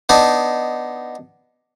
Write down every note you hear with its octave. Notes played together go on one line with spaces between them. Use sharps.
B3 D4 D#4